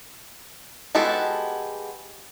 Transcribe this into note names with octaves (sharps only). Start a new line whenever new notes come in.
G#3 B3 F#4 G4 A4